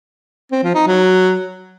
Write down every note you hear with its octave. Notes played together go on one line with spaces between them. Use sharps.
C4
F3
D#4
F#3